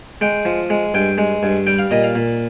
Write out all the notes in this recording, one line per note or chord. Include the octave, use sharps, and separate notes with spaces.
G#3 G5
F3
G#3
G2 G5
G#3
G2
G3 G5
F5
A#2 D#5
F5
A#2